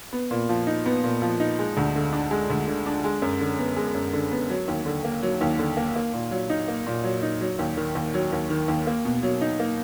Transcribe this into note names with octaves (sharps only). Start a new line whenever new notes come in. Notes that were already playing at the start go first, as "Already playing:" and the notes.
B3
A#2
F3
D#4
B3
A#2
F3
D#4
G#3
D2
D3
D4
G#3
D2
D3
D4
G#3
F#2
D3
B3
G#3
F#2
D3
B3
F#3
D#2
D3
A#3
F#3
D#2
D3
A#3
A#3
A#2
F#3
D#4
A#3
A#2
F#3
D#4
F#3
D#2
D#3
D#2
F#3
D#2
D#3
D#2
A#3
B2
F#3
D#4
A#3